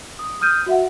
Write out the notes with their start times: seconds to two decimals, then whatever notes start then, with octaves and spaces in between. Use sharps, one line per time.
0.19 D#6
0.41 D#6 F6 G6 D#7
0.66 F#4 E5 F#5